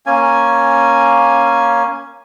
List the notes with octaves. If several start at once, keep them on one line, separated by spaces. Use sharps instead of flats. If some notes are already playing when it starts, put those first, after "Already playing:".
A#3 C#4 G#5